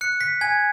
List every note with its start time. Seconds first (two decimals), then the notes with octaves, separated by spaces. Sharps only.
0.01 F#6 C#7
0.21 B6
0.41 G#5 G#6